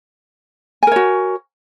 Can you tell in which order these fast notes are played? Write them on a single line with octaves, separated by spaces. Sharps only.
G#5 A#4 C#5 F#4